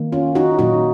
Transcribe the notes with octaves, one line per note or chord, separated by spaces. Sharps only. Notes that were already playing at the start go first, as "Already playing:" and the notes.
Already playing: D#3 A#3
C#4 F4
D#4 F#4
A#2 F#3 A#3 D#4 F#4